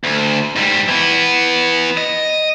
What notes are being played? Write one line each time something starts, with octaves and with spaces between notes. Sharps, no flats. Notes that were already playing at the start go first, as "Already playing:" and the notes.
D2
G#2 G3
E3 B3
D#5